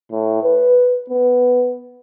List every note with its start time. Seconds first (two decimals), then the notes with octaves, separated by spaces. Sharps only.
0.12 A2
0.43 B4
1.10 B3